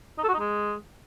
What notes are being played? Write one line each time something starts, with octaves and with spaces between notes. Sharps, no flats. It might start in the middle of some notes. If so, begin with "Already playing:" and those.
D#4
A4
F#4
D#4
G#3